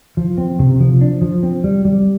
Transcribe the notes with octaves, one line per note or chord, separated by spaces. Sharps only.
F3
C4
C3
F3
D4
F3
C4
G3
G3